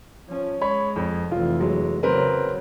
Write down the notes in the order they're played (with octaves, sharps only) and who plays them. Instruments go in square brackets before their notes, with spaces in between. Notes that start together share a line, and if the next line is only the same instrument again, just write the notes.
[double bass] F3 C#4
[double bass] G#3 [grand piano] C#5 B5
[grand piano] F2
[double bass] F1 E3 [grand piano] F4
[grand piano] F#3 G#3
[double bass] C#3 F#3 [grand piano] C4 A#4 B4